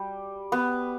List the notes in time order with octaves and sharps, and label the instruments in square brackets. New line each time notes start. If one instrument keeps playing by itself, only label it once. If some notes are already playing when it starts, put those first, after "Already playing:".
Already playing: [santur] G3
B3